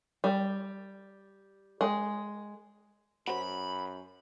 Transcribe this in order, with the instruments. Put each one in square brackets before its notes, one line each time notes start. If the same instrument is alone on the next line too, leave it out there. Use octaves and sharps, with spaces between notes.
[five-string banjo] G3
G#3
[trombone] F#2 [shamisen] F#4 C5 [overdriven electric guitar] B5